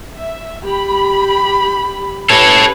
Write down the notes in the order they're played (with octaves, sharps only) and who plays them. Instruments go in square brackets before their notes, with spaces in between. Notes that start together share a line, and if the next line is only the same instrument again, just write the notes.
[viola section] E5
G4 B5
[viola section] C#4 G4 B4 [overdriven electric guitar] A4 C#5